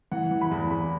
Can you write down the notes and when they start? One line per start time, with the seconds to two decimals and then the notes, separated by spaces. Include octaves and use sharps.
0.12 E3 F#5
0.31 E3
0.41 B5
0.51 E2
0.71 E2 B5